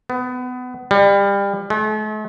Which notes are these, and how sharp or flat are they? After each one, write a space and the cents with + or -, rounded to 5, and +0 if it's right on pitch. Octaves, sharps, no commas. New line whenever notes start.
B3 +25
G3 +30
A3 -45